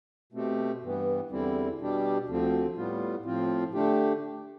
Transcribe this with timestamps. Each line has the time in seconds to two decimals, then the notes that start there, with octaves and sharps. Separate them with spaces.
0.33 B2 A3 C4 G4
0.81 G2 E3 B3
1.30 E2 D3 G3 C4 E4
1.79 B2 G3 D4 G4
2.27 D2 D3 F3 C4
2.76 A2 G3 B3 F4
3.25 A2 F3 C4 F4
3.74 D3 A3 D4 G4